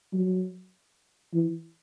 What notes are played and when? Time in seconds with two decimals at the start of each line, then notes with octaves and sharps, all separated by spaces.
0.13 F#3
1.34 E3